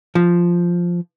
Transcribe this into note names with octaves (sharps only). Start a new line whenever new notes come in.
F3